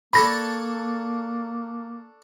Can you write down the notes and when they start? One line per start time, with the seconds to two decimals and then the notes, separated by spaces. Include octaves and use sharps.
0.13 A#3 D4 A4 C#5 B5 A#6